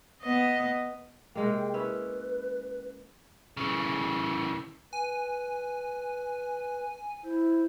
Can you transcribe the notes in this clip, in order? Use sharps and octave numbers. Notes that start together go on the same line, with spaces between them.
B3 D#5
C3 G#3 A#3 G5
C#4 E4 B4
C#3 E3
B4 G#5
E4 C5